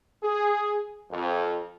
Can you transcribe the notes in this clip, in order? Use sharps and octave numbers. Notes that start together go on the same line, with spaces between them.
G#4
F2